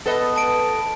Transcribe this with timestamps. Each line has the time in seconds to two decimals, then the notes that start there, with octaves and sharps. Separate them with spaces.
0.06 B3 A4 B4 D#5
0.36 A5 D7